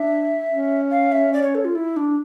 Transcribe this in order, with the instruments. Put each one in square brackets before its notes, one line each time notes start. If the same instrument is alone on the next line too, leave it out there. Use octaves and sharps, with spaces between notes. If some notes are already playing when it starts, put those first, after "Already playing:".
Already playing: [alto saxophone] D4 [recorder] E5
[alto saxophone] C#4
[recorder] F5
E5
D5
C#5
A4
F4
E4
D4